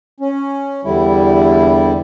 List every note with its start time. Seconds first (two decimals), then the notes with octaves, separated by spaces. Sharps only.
0.20 C#4
0.85 E2 D3 G3 E4